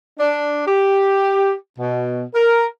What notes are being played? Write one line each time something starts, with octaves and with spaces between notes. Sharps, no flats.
D4
G4
B2
A#4